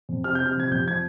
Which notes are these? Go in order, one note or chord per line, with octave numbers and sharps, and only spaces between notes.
F2
C3 F6
G6
C3
F6
F3 G#6
F2 G6
F3 G#6